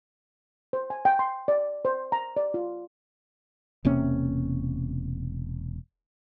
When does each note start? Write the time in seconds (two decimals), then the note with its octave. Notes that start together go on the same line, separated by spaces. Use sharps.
0.73 C5
0.90 G#5
1.05 G5
1.19 C6
1.48 D5
1.85 C5
2.12 A#5
2.37 D5
2.54 F4
3.85 E1 C3 A#3 C#4